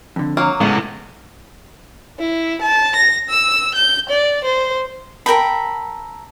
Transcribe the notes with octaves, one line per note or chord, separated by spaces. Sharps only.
F2 D3
F#3 A#3
A2 G#3 B3 C#4 F5
E4
A5
A#6
E6
G6
D5
C5
A4 A#4 G5 B5